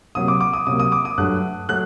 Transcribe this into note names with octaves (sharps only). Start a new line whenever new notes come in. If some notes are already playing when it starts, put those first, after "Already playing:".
C3 F#3 A#3 D#6
D6
D6
D#6
C3 F#3 A#3 D#6
D#6
D6
D#6
G2 F#3 A3 F#6
F#3 A3 F#6